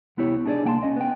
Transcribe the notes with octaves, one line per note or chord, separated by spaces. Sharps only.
C2 B3 E4 G4 C#5
D4 D#4 G#4 C5 D5
C2 A#3 G5 A5 C6
C#4 D#5
B3 G5